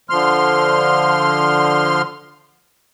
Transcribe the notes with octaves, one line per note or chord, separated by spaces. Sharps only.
D3 F3 C6 F6